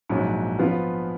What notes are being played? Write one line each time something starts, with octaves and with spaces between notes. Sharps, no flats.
A#1 G#2 F#3
F3 B3 F4